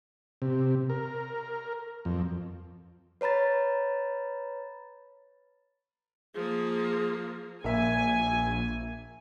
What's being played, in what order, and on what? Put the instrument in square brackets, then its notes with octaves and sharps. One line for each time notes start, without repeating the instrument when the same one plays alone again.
[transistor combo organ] C3
A#4
F2
[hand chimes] B4 C#5 A#5 B5 A6
[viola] F3 A#3 [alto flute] G#4
[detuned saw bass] A#1 [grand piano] A#3 E5 [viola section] G#5